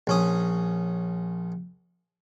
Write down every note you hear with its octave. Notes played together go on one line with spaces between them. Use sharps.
A#1 C#4 D#6